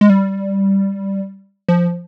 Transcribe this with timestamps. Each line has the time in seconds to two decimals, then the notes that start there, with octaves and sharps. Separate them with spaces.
0.01 G#3
0.10 G3
1.69 F3